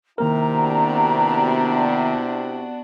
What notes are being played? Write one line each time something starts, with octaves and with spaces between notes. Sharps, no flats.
C3 D#3 A#3 E4 A#4 A#5
B3 D4 F#4